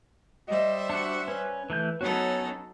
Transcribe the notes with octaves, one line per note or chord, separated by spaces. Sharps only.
G3 C5 D#5 E5
D4 F#4 C#7
C#4 B4
E3 A3 G6
F#3 B3 C#4 D#4 F#4 A4 C#5